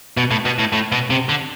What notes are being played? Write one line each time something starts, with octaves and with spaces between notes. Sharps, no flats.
B2
A2
B2
A2
A2
B2
C3
D3